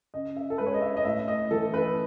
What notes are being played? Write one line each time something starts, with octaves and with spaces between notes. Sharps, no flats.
C#3 D#5
E5
A4
G#3 B4
C#5
D#5
E5
D#5
A2 E5
D#5
E3 A3 A4
B4